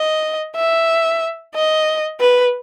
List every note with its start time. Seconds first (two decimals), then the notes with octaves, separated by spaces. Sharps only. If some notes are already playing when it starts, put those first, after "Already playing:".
Already playing: D#5
0.56 E5
1.55 D#5
2.20 B4